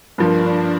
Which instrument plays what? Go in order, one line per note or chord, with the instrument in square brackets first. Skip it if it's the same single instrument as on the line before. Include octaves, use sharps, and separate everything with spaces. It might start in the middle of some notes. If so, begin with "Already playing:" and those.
[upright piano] G2 F3 A#3 [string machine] D4